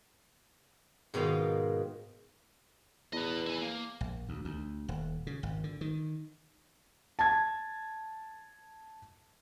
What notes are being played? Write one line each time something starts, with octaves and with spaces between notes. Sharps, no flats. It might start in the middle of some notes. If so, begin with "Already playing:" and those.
G#2 B2 D#3 F4 F5
E2 B4 D#5
E4 G#5
A#3
A#1
D2
D2
D#1
C#3
G#1
D3
D#3
A5 G#6